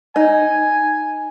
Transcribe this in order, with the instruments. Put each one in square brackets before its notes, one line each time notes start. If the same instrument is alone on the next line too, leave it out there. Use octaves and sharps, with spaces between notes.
[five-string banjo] D#4 [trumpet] G#5